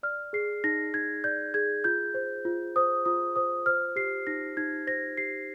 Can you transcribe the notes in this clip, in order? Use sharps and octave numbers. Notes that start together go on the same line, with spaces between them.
D5 F6
G#4 C7
D#4 A#6
D#4 G#6
D5 G6
G#4 G#6
F4 G6
C5
F4
C5 D#6
F4 D#6
C5 D#6
C5 F6
G4 C7
D#4 A#6
D#4 G#6
C5 A#6
G4 C7